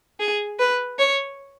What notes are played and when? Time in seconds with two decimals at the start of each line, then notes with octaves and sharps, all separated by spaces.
0.20 G#4
0.59 B4
0.99 C#5